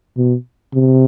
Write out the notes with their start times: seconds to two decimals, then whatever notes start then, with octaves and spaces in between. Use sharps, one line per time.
0.17 B2
0.74 C3